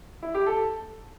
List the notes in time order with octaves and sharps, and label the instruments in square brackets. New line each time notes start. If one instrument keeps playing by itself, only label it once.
[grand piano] E4
G4
A4